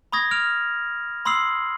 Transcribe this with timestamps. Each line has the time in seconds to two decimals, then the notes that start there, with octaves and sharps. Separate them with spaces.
0.12 B5 C#6 D#6 G#6 A#6
0.31 D#6 F6 D7 F7
1.25 B5 C6 D#6 E6 C7 F#7